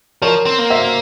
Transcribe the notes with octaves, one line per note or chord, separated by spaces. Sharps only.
F3 A#4 C#5
C4
A#3
C5 E5